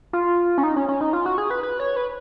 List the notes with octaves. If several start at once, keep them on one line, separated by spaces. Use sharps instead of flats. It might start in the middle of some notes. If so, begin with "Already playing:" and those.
F4
C#4
D#4
C#4
C#4
D#4
F4
F#4
G#4
B4
B4
C#5
B4